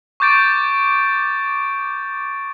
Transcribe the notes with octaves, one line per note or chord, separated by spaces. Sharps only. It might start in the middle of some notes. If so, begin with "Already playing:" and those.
C#6 D6 G6 A6 D7